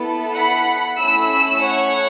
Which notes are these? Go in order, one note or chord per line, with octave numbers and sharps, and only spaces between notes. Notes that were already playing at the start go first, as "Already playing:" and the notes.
Already playing: B3 E4 A4
F#5 B5
A3 C#4 E4 B5 E6
C#5 F#5